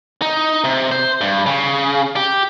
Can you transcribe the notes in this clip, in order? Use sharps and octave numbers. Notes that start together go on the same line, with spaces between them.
D#4
C3
C5
G2
C#3
G4